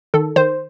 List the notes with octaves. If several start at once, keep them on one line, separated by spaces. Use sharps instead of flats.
D#3 A4
D#3 C5